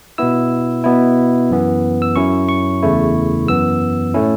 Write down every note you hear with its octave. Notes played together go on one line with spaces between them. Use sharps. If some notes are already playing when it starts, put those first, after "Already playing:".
B2 B3 E4 E6
B2 B3 E4
F#2 E3 B3
E6
F#2 F#3 C#4 E4 C#6
C#6
E2 C#3 A3 E4
F#2 E3 B3 E6
A2 A3 C#4 E4